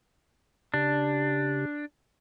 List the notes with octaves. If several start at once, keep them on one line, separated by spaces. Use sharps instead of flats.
C#3 D4 G4